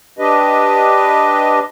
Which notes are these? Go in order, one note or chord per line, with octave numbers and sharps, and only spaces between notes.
D4 G4 B4 D#5